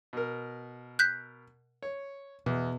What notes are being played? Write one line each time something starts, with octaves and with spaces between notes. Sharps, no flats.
B2 A#4
F#6 G6 B6
C#5
E2 B2